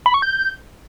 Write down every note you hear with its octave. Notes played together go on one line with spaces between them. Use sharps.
B5
C#6
G6